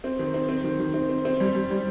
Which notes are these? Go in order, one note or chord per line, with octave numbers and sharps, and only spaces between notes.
C4
D#3
C4
C4
D#3
D#3
C4
C4
C4
G3
G3
G3